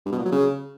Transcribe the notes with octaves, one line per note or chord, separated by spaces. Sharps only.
G2
B2
A#2
F#3
C#3